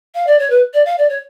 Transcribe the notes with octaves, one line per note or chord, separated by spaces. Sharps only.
F5
D5
C#5
B4
D5
F5
D5
C#5